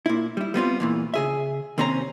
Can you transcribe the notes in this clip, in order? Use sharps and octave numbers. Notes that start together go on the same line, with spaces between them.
A#2 E4
G3 E4
G3 B3 C4 F4
E2 A#2 E3
C#3 G#4 E5
D#2 C3 C4 C#4 E4 A#5